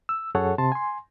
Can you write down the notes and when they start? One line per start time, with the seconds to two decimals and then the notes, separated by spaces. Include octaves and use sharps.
0.09 E6
0.35 F#2 G#4 A4 C#5 F#5
0.58 C3 A5 C6
0.72 G#5 C6